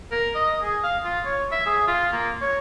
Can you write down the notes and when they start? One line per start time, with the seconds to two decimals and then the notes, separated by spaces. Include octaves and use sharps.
0.12 A#4
0.35 D#5
0.62 G#4
0.84 F5
1.04 F4
1.25 C#5
1.52 E5
1.66 G#4
1.88 F4
2.12 A#3
2.41 C#5